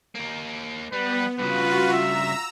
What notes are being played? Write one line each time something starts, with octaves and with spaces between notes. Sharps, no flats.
A#3 D#4
G3 B3 B4
G2 C#3 F4 F#4 B4
E5 A#5 E6